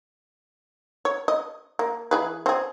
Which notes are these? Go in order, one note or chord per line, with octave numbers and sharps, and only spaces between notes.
C#5
D#5
A#3
E3 G#4 B4
C4 G#4